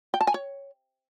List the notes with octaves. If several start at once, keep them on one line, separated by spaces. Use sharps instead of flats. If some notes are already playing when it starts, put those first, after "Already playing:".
G5
A5
G#5
C#5